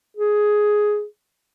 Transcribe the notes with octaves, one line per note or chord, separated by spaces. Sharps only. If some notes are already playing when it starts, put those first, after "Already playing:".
G#4